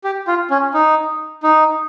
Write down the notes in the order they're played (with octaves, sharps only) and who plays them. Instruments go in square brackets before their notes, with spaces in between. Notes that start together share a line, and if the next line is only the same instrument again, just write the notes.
[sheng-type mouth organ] G4
F4
C#4
D#4
D#4